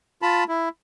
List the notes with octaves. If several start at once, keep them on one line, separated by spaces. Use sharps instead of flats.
F4 A5 B5
E4